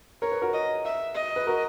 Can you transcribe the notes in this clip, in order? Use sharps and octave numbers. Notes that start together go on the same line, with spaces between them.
A#4 C#5
B4
F#4 A#4
D#5
E5
D#5
B4
F#4 A#4